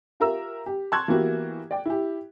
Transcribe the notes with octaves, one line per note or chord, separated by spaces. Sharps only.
F4 G4 A#4 E5 A#5 E6
G4
A5 C6 C#6 E6 F#6 G#6
E3 A#3 B3 E4 F#4 G4
D5 G5
E4 G4